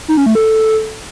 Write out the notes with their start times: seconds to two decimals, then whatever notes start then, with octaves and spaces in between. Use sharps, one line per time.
0.08 D#4
0.17 C#4
0.26 A3
0.35 A4